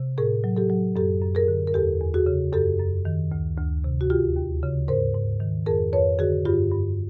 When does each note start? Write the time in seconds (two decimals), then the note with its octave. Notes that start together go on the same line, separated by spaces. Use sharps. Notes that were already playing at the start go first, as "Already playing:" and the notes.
Already playing: C3
0.18 A2 G#4 A#4
0.44 F#3
0.56 G4 A4
0.70 F#3
0.96 F#2 G4 A4
1.22 F#2
1.35 G#4 A#4
1.48 D3
1.67 A#4
1.74 E2 G4 A4
2.01 E2
2.14 F#4 G#4
2.26 C#3
2.53 F#2 G4 A4
2.79 F#2
3.05 D#3
3.32 D2
3.58 D2
3.84 C3
4.01 F#4
4.10 D#2 F4 G4
4.36 D#2
4.63 C#3
4.88 G#2 A#4 C5
5.15 G#2
5.40 D#3
5.66 F2 G#4 A#4
5.92 F2 B4 C#5
6.19 D3 F#4 G#4
6.45 G2 F4 G4
6.72 G2